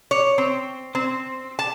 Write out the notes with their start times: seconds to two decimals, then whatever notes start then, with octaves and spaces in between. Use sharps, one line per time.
0.11 C#5
0.38 C4
0.95 C4
1.59 A5